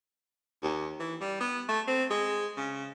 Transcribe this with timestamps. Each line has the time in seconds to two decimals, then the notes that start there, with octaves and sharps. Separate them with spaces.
0.62 D#2
1.00 E3
1.21 G3
1.40 B3
1.69 A3
1.88 C4
2.10 G#3
2.57 C#3